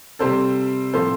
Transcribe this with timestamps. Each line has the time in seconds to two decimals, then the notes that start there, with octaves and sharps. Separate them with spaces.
0.19 C3 G3 C4 A4 C5
0.94 A2 F3 A3 C4 A4 C5